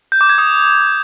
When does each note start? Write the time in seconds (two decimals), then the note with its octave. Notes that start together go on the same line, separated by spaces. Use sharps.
0.12 G6
0.21 D6
0.29 G#6
0.38 D#6